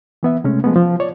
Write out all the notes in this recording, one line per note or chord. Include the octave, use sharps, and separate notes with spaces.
E3 B3 E5
C3 G#3 A3 C#4
F3 G#3 A3 B3
F3
C#5 D5